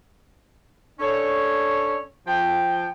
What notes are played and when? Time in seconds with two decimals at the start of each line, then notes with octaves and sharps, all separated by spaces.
1.00 C#4 D4 A4 C#5
2.26 F3 G5